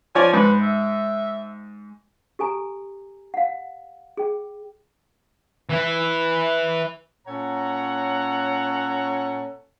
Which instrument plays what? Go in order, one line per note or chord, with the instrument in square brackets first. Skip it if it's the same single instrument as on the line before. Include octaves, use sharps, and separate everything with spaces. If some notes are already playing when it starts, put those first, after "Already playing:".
[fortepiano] F3 C#5 D5 [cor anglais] G#5
[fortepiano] G#2 [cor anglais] B4
[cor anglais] E5
[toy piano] G4 A4 G#5 A#5
F5 F#5
G#4 G5
[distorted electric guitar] E3
[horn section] A#2 C#4 A4 C#5 F#5 A#5